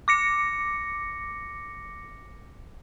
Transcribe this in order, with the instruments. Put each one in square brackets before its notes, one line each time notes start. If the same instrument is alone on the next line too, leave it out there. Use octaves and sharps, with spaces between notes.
[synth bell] D6 A#6 C#7